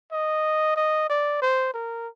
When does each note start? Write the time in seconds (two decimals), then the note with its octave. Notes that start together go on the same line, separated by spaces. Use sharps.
0.12 D#5
0.76 D#5
1.09 D5
1.41 C5
1.74 A#4